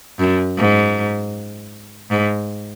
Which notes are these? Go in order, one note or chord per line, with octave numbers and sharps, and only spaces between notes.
F#2
G#2
G#2